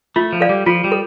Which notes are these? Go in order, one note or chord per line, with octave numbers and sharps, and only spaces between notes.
A3 F4
F3
A4 D5 F5
G3
F3 F4
G3
A4